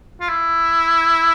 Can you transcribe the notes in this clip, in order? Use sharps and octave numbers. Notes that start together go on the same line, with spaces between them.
F4
E4